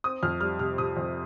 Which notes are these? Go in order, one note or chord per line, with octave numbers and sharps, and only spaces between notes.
C4 D#6
F2 F6
G3 F6
C3 F6
C3 D#6
F2